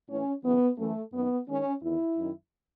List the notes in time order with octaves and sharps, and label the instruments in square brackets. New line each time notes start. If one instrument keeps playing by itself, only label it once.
[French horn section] A2 E3 C#4
F#2 C#3 E3 B3
F#2 E3 A3
F#2 D#3 B3
G#2 D#3 C#4
E2 D#3 E4
F#2 D#3